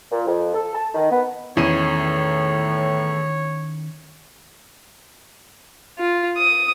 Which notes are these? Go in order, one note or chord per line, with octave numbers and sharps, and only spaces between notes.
A#2
F2
A4
A5
D#3
B3
E2 A2 D#3 C#4 E4 C#5 D#7
F4
D#6